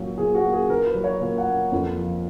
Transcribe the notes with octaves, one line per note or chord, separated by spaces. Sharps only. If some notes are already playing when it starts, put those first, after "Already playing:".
Already playing: A#2 F#3
A#2 G#4
F#4
A#3
G#4
A#2 A#4
B4
F#3
C#5
A#2 A#4
F#5
A#3
F2
F3